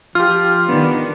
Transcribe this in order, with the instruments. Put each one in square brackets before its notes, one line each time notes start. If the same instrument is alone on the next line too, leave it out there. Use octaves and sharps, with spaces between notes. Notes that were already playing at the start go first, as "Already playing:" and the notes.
[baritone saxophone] F3 [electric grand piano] F4 G4 [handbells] F6
[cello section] D#3 D4 [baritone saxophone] B3